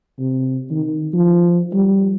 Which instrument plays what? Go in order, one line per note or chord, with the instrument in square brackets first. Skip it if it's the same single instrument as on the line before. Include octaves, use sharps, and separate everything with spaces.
[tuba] C3
D#3
F3
G3